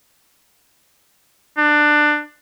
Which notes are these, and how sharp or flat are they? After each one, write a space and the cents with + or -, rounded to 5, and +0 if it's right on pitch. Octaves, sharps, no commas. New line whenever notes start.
D4 +20